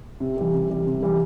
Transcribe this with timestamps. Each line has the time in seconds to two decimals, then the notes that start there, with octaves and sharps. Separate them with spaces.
0.20 C3
0.37 E3 G3
0.54 C3
0.70 E3 G3
0.87 C3
1.03 E3 G3